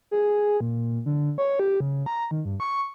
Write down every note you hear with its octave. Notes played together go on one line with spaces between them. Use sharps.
G#4
A#2
D3
C#5
G4
C#3
A#5
D#3
G2
C#6